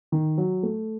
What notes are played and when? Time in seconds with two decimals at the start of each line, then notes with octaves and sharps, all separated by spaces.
0.12 D#3
0.38 F#3
0.63 A3